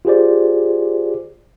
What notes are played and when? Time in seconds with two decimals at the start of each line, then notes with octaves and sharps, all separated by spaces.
0.05 F4 G4 G#4 C5 D5